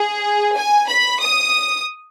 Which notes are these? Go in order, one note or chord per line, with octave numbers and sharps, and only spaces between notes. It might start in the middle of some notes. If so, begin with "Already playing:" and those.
Already playing: G#4
G#5
B5
D#6